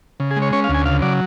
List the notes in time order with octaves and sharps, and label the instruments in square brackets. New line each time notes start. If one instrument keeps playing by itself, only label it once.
[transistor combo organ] C#3
G#4
G#3
C#5
C#4 C#5
F5
D2
G#5
C#3 F5
F#3 D5